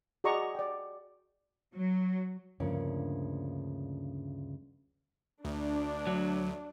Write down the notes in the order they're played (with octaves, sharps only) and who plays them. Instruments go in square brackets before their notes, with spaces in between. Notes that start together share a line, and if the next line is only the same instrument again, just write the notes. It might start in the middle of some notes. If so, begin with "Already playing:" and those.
[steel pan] F#4 G#4 D5 D#5 A#5 C#6
D5 G5
[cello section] F#3
[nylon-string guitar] D2 G2 C#3 F3 A#3 C#4
[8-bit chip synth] D2 [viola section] D4
[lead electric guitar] F#3